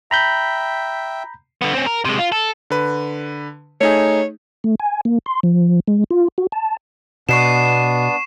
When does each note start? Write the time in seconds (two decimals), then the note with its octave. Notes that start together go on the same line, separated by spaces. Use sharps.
0.11 E5 G5 A#5 B5 G6
1.62 D3 B3
1.73 C4 C#4
1.86 A#4
2.05 C3 G#3
2.19 F4
2.32 A4
2.70 D3 B4
3.81 A3 D#4 G#4 C#5
4.64 A3
4.80 G#5
5.05 A#3
5.26 C6
5.43 F3
5.88 G#3
6.11 F4
6.38 F#4
6.52 A5
7.29 B2 B3 D4 C#6 C7 E7